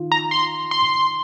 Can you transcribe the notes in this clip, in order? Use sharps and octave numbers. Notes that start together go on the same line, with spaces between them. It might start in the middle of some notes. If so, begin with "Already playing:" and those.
Already playing: D#3 F4
A#5
C6
C6